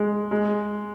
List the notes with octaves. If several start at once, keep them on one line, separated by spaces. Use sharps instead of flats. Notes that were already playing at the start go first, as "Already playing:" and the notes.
Already playing: G#3
G#3